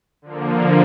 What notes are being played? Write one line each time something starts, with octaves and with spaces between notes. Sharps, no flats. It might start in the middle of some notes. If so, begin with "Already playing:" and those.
D3 F3 A#3